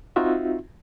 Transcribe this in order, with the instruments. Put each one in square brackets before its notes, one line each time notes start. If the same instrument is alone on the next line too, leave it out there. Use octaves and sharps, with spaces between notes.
[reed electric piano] C4 D#4 F4 F#4 E5